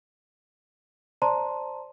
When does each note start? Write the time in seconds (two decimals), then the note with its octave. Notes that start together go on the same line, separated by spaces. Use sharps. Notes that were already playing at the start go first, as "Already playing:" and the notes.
1.22 C5 D5 A5 A#5 C6